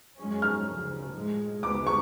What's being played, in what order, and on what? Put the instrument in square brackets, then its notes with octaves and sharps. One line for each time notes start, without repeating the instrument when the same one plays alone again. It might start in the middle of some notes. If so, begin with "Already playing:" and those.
[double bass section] F#2 F3 G#3 C#4
[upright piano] F6
[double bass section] D2 C#3 F3
A2 F3 G#3
[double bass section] D2 C#3 F3 G#3 B3 [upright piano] D6
[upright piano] C#6